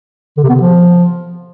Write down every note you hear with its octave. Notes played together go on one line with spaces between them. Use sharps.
D3
C3
B3
C3
F3